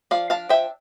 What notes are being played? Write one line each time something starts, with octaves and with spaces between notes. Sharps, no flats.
F3 D5 F5
D4 F5 A5
F3 E5 G5